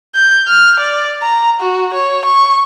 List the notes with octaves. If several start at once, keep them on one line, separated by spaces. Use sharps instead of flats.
G6
F6
D5
A#5
F#4
C#5
C#6